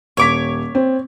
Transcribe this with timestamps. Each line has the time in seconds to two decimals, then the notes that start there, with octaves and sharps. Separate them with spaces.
0.17 D#1 C#5 D6 B6
0.75 C4